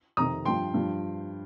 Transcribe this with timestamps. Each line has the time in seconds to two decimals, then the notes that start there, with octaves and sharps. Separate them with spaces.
0.17 F2 C3 D#3 A#5 D#6
0.45 G2 F3 G5 C6
0.74 G2 F3